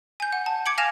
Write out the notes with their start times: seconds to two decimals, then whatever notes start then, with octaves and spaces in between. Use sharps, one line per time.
0.20 G#5 G6
0.33 F#5
0.46 A5
0.66 D6 G#6 C#7 D7 F#7
0.78 F5 G#5 F6 A#6 E7 F7